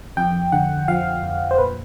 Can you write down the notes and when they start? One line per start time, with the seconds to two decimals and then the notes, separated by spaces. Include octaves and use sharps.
0.17 F2 G5
0.52 D3 F#5
0.88 F3 F5
1.23 F2
1.51 C5
1.58 A#2 B4